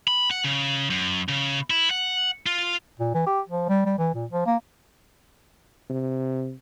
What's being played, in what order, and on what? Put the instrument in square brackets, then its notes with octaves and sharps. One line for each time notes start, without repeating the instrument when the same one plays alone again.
[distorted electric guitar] B5
F#5
C#3
F#2
C#3
E4
F#5
F4
[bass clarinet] A#2
E3
G4
F3
G3
G3
E3
A#2
F3
A#3
[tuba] C3